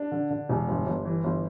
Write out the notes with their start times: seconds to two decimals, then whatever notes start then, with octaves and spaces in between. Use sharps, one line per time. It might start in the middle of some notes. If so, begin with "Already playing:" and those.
Already playing: D4
0.12 D3
0.30 D3
0.49 E1
0.68 G1
0.86 G1
1.05 E3
1.24 G1